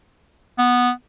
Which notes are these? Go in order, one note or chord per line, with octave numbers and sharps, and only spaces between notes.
B3